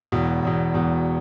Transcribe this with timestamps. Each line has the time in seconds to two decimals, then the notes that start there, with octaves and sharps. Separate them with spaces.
0.12 E1 E2 B2
0.42 E1 E2 B2
0.74 E1 E2 B2